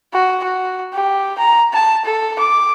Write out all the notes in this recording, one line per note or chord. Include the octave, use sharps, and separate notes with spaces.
F#4
F#4
G4
A#5
A5
A4
D6